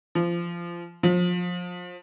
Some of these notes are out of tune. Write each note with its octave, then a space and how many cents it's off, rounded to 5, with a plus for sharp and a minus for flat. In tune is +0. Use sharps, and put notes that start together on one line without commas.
F3 -20
F3 +30